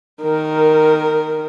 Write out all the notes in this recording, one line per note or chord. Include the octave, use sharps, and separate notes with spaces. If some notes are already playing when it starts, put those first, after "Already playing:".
D#3 A#4